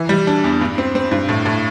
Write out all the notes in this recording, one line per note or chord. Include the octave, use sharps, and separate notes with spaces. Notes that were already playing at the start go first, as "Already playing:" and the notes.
Already playing: E3
G3
D4
E2
G2
C4
C4
G2
A2
A2